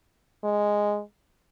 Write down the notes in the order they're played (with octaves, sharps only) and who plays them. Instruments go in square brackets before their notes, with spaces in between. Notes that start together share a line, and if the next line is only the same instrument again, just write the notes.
[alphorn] G#3